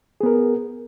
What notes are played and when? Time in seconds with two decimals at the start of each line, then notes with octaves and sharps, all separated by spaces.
0.21 G#4
0.23 B3
0.26 A#4